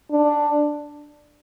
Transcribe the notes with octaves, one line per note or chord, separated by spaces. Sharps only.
D4